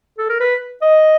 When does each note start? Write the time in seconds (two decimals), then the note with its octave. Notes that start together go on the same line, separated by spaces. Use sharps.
0.18 A4
0.29 A#4
0.40 B4
0.82 D#5